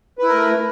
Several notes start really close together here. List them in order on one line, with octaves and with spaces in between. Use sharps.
B4 E4 A#4 A3